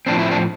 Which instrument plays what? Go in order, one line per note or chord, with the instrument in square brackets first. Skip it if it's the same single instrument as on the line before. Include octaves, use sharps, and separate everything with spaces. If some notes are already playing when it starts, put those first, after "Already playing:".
[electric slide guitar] A2 F3 C4 D4
E4
D4